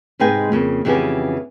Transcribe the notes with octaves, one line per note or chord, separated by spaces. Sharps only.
G#2 C3 G#3 B4 G5 G#5
F2 C#3 A#3
F2 C#3 E3 B3 G4 G#5